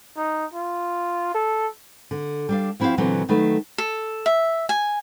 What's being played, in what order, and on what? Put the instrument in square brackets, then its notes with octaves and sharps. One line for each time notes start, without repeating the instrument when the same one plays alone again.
[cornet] D#4
F4
A4
[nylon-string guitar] D3
G3 D4 F5
F3 C4 E4 F#4 G4 F5
A#2 D3 E3 F#3 B3 C4
D#3 F#3 A3 B4
[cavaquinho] A4
E5
G#5